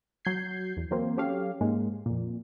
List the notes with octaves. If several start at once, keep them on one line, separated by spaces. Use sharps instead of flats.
F#3 G6 G#6 C7
E2
E3 F#3 A#3 C4 C5
F#3 C#4 G4 A4 C#5 F5
G#2 G#3 A#3
F2 A#2